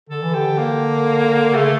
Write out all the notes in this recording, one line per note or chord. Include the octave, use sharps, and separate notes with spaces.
D3 A4
E3
D3 G4
A#3
C#3 A3